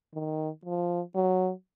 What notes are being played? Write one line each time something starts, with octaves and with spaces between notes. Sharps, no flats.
D#3
F3
F#3